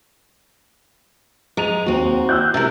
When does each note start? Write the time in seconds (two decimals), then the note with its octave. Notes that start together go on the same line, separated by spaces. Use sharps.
1.57 G#3 A#5 D#7 F7
1.86 D#2 C4 F#4
2.29 E6 F#6 G6
2.54 C3 E4 A#4